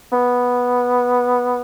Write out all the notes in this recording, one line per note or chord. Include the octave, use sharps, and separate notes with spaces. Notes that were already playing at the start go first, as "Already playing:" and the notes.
B3